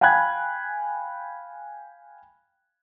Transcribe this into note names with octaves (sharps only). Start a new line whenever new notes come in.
F5 G5 G#5 B5 F#6 G#6